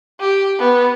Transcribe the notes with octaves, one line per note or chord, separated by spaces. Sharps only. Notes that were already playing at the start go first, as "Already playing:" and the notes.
G4
B3